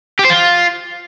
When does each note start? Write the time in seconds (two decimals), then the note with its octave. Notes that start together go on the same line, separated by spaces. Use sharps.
0.19 G4
0.25 C5
0.30 F4